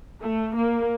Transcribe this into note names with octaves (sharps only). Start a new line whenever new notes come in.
A3
A#3